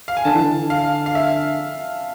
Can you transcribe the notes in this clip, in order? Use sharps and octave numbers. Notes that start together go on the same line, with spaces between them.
F5
G#5
D3 A5
E3
D3
F5
F5
E5